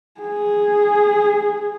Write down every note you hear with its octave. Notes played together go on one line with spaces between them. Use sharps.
G#4